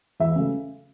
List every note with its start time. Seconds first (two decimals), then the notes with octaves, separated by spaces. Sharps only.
0.20 E2 E5
0.36 C#3 F#3 A3